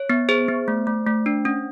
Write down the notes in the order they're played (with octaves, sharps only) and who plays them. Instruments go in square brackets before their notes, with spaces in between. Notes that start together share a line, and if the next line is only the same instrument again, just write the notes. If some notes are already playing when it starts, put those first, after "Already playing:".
Already playing: [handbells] C#5
B3
G#4 C5
B3
A3
A3
A3
D4
C#4